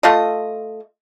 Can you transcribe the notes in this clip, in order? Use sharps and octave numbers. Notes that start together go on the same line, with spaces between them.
A3 F4 D#5